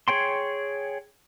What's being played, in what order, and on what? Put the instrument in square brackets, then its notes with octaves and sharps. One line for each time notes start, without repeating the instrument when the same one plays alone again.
[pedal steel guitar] G#4 C#5 G5 C6